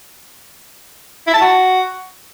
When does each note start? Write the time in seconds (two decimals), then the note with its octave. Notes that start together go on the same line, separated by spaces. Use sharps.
1.27 E4
1.34 A5
1.41 F#4